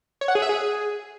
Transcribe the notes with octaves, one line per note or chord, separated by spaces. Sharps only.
C#5
F#5
G#4
E5
G#4